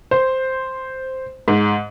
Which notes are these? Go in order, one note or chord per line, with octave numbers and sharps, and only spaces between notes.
C5
G#2